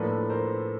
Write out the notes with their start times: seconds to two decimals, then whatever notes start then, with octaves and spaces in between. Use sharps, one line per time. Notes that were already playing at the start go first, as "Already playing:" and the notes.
Already playing: A2 F3 A#3 D4 A4 B4
0.30 A#4 C5